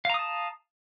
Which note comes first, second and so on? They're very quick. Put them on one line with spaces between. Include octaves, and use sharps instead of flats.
F5 A#5 D#6 A5